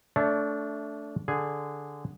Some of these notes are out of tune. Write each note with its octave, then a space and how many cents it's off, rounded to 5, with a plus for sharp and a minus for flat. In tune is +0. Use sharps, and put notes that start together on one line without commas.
A3 -5 D4 -20 C#5 +0
D3 +0 G#4 +0